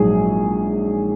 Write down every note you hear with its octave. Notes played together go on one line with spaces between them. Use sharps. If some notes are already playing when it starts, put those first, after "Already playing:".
Already playing: A#1 G#2 F#3 G#4